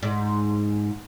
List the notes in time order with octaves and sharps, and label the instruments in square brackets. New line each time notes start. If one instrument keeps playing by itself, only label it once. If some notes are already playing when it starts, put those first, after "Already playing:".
[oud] G#2